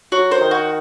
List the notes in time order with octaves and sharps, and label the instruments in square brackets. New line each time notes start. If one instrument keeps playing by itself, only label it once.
[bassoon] F#3 [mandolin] F#4
[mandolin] C5
[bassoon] D#3
[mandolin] F#4